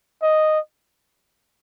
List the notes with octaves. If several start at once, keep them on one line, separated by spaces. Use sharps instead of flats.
D#5